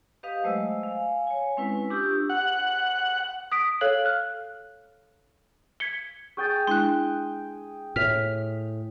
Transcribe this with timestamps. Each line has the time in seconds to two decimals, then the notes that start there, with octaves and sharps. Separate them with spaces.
0.23 G4 B4 D#5 F5 D#6
0.44 F#3 G#3 A3 C5 D#5 E6
0.83 F5 G#5
1.27 C#5 G#5
1.57 G#3 C4 C#4 E4 B4
1.90 D4 F4 G4 C#6 D#6 E6
2.30 F#5
3.52 D#6 B6 D7
3.81 A4 C#5 F5 F#6 F#7
4.05 F6 F#6
5.80 G#6 B6 C#7 G7
6.37 G#4 G5 C#6 A6
6.67 G#3 D4 E4 C6 F#6
7.96 A2 F6 B6 F7